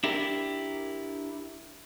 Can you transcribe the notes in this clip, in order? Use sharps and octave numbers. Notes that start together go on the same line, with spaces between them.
D4 E4 G4 A#4